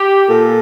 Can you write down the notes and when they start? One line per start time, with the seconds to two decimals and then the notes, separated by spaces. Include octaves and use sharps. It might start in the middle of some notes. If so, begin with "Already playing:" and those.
Already playing: G4
0.29 A#2 A4